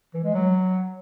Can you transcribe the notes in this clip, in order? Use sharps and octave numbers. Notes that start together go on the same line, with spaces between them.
E3
G#3
F#3